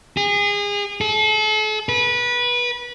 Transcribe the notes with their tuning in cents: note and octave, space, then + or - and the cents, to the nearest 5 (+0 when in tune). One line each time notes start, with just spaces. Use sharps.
G#4 -30
A4 -40
B4 -25